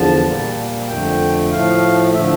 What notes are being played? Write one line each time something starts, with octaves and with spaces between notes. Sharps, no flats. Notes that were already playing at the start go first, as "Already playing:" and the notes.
Already playing: E2 D3 F3 A5
A#2 G3 A#3
F2 D3 A3 G5
A2 F3 A3 F5
D3 F3 A3 E5